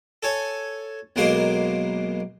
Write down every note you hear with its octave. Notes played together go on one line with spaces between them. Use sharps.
A4 C#5 G#5
B1 B2 G#3 A#3 C5 C6